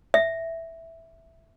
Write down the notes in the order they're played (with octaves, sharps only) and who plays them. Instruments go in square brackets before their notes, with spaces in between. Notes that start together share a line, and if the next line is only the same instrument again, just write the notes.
[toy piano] E5